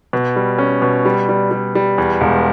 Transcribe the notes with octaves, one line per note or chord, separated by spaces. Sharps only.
B2
G3
C#4
B2
G3
G3
G3
G3
E2
E1